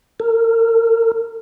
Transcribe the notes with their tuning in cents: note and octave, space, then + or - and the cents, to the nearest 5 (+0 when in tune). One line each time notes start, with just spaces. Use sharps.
A#4 -35